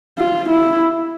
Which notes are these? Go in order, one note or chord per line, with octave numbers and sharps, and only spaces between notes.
F4
E4